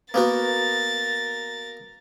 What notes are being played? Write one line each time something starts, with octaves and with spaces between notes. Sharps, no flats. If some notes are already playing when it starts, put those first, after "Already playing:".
A#3 B3 F#4 A#4 A6